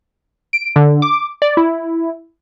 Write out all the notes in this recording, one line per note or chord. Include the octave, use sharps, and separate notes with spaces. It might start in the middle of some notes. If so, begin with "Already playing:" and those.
D7
D3
D6
D5
E4